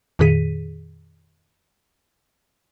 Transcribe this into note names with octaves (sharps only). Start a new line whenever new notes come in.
F2 A#2 D#3 G#4 B6 D#7